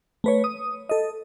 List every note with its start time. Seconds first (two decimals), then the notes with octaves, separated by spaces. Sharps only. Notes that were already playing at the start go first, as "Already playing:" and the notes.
0.24 A3 B4 C#5
0.44 D#6
0.89 A4 D#5